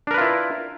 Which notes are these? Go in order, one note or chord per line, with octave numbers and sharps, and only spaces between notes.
D4 E4 F4 A#4 B4